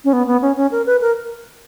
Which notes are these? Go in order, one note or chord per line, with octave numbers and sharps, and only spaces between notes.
C#4
B3
B3
C#4
C#4
A#4
B4
A#4